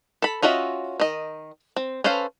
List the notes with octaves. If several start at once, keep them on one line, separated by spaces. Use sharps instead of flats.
A4 B5
C#4 F4 F#4 D#5 E5
D#3 D#5
C4
C#4 A4 B4 C5 F5